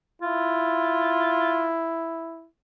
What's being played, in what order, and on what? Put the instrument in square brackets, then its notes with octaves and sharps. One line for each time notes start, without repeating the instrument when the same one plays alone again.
[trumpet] E4 [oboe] F4